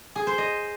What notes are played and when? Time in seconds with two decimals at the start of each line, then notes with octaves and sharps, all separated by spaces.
0.16 G#4
0.27 C5
0.38 D#5